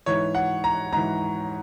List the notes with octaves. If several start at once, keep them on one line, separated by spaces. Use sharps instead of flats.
G#2 E3 C#5
F#5
A#5
G#2 E3 A#5